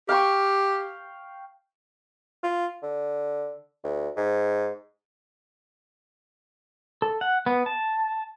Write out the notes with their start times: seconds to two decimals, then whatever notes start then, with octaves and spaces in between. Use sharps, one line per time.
0.09 G4 F5 G5 C#6
2.44 F4
2.83 D3
3.84 D2
4.17 G#2
7.02 A4
7.21 F#5
7.46 B3
7.66 A5